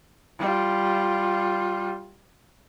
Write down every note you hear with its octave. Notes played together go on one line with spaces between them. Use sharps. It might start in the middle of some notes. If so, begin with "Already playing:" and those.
G3 F4